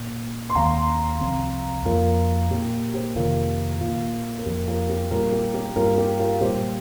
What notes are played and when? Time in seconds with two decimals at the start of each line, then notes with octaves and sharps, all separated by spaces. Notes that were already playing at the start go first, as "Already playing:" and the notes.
Already playing: A#2 A#3
0.50 C6
0.55 D#2 D#3 A#3 F5 A#5
1.21 C2 C3 F3 C4
1.85 F2 F3 A#3 F4 A#4
2.50 A#2 A#3 G4
2.94 G4 C5
3.15 F2 C3 D#3 A#3 F4 A#4
3.81 A#2 A#3 F4
4.38 A#4
4.45 F2 F3 A#3 G4
4.67 F4 A#4
4.90 G4
5.11 A#2 G3 A#3 F4 A#4
5.32 G4
5.54 G4
5.75 G2 G3 A#3 F4 A#4
5.98 G4
6.19 F4 A#4
6.41 A#2 G3 A#3 G4 C5